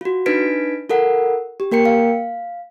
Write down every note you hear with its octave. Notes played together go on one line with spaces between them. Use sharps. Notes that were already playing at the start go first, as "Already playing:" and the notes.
F4 F#4
D4 D#4 B4 G#6 B6 D7
F4 A4 A#4 F#5
G4
A#3 A#4 G5 C#7
F5